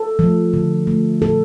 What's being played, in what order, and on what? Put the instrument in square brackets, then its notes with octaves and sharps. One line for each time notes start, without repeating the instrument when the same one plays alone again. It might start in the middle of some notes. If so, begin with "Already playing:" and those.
Already playing: [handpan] A4
F3 A3
D3
A3
A#2 A4